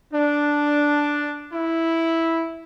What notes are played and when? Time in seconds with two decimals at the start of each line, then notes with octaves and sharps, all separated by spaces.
0.13 D4
1.53 E4